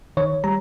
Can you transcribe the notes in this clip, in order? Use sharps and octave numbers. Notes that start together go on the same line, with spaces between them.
D#3 C#5
G3 A#5